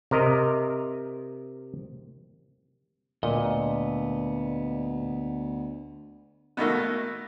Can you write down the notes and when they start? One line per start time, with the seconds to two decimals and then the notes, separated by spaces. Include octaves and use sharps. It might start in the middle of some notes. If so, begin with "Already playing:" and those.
0.11 C3 A#4 D#5
3.23 D2 A#2 B3 D#5
6.57 B2 D#3 A3 A#3